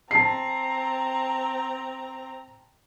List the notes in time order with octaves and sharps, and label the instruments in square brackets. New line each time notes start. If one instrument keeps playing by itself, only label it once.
[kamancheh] C4 A#5 [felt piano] A5 C7